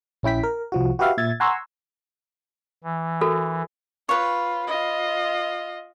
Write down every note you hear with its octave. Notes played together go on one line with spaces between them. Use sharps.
A#1 C#4 E4 G5 B6
A#4
C2 F3 F#4
F#4 G4 B4 E5 F5
A#2 E5 G#6 A6
F#5 G#5 A#5 C6 C#6 E6
E3
F#4 A4 A#4
F4 B4 C#5
F4 D#5